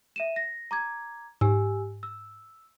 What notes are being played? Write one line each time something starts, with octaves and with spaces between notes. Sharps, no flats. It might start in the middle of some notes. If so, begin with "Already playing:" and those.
E5 D#7 E7
A#6
A#5 D6 G#6
G#2 G4 G#5 E6
E6